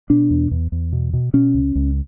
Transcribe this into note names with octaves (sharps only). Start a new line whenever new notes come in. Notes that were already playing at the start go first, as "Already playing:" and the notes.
B2 D4
E2
E2
E2
B2
B2
B2 C#4
C#2
C#2